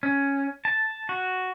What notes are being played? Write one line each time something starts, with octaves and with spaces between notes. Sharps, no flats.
C#4
A5
F#4